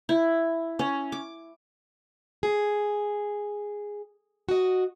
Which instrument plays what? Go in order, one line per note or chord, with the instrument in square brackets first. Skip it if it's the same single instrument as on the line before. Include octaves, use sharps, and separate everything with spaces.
[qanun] E4
C#4
D6
[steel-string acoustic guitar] G#4
F#4 D#5